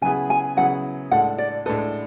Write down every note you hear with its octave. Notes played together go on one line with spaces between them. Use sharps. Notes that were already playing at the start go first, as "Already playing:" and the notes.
C#3 F#3 B3 E4 G#4 G#5
G#5
C#3 F#3 B3 E4 G#4 F#5
A2 G#3 D4 A4 F#5
D5
A2 G#3 D4 A4 B4